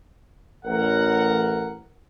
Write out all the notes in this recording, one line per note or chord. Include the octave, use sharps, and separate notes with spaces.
A1 A#4 F#5